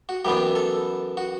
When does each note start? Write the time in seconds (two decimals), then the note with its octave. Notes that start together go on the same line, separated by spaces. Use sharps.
0.09 F#4
0.25 F#2 E3 B3 D4 G4
0.55 A4
1.17 F#4